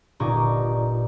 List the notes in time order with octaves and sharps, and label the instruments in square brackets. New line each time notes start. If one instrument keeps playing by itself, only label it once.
[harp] G1 A#2 D#4 C#6 D6